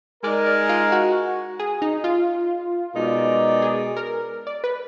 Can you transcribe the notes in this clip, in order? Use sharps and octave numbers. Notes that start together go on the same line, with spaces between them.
G#3 D#4 A#4 D5
D5
F4
F#4
G#4
D#4
F4
B2 G#3 D#4 A#4 D5
G#4
A#4
D5
B4